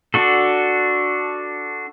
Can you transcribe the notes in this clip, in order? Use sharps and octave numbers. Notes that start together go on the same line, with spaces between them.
D4 F#4 A4